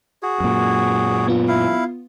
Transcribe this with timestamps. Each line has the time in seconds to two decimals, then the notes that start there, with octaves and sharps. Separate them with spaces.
0.23 F#4 G#4
0.40 F#2 A#2
1.28 B3 F4
1.48 E4 F5